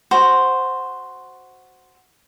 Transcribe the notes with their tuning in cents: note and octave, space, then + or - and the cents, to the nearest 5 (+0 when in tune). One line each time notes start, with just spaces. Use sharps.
F#4 +0 C5 +0